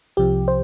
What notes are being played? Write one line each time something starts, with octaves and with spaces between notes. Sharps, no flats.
C2 C3 F3 G4
C5